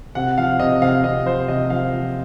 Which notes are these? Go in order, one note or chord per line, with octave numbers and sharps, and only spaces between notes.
C3 F#5
F3 F5
C3 D#5
C3 F5
C3 D#5
F3 C5
C3 D#5
F3 F5
F3